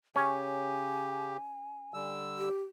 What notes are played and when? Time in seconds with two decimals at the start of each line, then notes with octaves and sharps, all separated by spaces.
0.16 C#3 C#4 G4 G#5
1.94 D3 G3 E6
2.38 G4